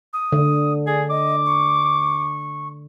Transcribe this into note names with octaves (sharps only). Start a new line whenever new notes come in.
D#6
D3
G#4 D5
D#5 D6
C#6